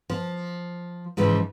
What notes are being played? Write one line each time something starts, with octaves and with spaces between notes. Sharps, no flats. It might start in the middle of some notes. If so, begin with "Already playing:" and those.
F3
G#2 C#3 E3 F3